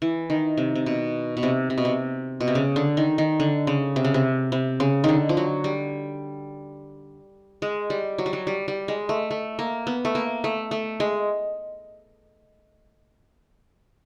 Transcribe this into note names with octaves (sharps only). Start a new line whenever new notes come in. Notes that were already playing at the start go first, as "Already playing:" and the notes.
E3
D#3
C3
C3
B2
B2
C3
C3
B2
C3
B2
C3
C#3
D3
D#3
D#3
D3
C#3
C3
C#3
C3
C3
C#3
D3 D#3
F3
F#3
G3
G#3
G3
F#3
G3
F#3
G3
G3
G#3
A3
A3
A#3
B3
A3
A#3
A3
A3
G#3